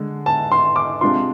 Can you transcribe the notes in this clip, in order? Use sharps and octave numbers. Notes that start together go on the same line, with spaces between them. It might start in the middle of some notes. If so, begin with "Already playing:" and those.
Already playing: D3 G#3
A5
C6
D6
C3 G#3 D4 F4 C6